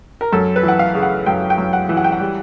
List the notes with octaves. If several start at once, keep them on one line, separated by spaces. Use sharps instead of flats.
A#4
F#2 A4
B4
E3
F#5
F5
C#3
F#5
F#2 G5
G5
F#2
F#5
E3
F#5
G5
F#5
G3